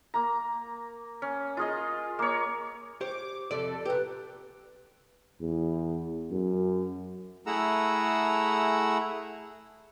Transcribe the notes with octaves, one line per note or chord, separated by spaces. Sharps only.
A#3 A#5
C#4
F4 G#4 D#5
A#3 C#5
G4 C5 C#5 D6
F2 C3 A4 D5
A#2 G4 B4
E2
F#2
A3 E4 G#4 F#5 A#5 E6